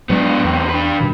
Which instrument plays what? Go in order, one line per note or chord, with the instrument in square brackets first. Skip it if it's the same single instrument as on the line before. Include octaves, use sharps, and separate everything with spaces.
[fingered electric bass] G#2 F#3 G#3 [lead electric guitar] B3 D4
[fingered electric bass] E2 [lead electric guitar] A2 C3
[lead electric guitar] D4 B4
[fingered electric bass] G2 B2 D#3